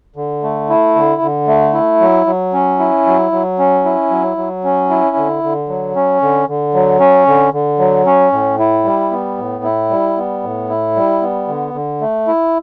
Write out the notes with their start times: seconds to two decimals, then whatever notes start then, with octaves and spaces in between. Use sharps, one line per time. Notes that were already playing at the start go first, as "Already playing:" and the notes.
0.16 D3
0.43 A3
0.70 E4
0.95 D3
1.22 D3
1.48 A3
1.74 E4
2.01 F#3
2.27 F#3
2.53 C#4
2.79 E4
3.06 F#3
3.32 F#3
3.59 C#4
3.85 E4
4.11 F#3
4.37 F#3
4.64 C#4
4.90 E4
5.16 D3
5.43 D3
5.69 F#3
5.96 C#4
6.22 D3
6.48 D3
6.74 F#3
7.00 C#4
7.27 D3
7.53 D3
7.79 F#3
8.06 C#4
8.32 A2
8.59 E4
8.85 G3
9.11 B3
9.38 A2
9.64 E4
9.90 G3
10.17 B3
10.43 A2
10.69 E4
10.96 G3
11.22 B3
11.48 D3
11.74 D3
12.01 A3
12.28 E4